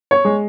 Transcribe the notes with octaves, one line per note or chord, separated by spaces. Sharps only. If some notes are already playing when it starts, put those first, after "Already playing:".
C#5
G#3